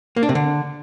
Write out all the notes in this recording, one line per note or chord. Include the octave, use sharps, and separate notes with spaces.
A#3
D4
C3
D3